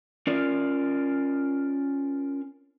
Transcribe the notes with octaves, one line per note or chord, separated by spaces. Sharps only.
C#4 F4 A#4 D5